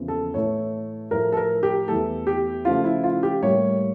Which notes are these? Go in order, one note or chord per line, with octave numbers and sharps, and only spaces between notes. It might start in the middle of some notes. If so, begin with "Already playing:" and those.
Already playing: E2 C#3 F3 A#3
A4
A2 E3 A3 C#5
A2 F3 A3 A#4
A4
A#4
G4
E2 E3 A3 A4
G4
C#3 F3 A3 F4
E4
F4
G4
A2 G3 A#3 C#5